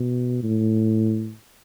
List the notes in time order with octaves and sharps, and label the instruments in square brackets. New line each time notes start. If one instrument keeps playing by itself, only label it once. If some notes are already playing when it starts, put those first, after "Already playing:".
Already playing: [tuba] B2
A2